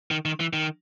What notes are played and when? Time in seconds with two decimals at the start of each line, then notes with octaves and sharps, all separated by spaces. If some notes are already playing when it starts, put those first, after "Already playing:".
0.11 D#3
0.25 D#3
0.40 E3
0.53 D#3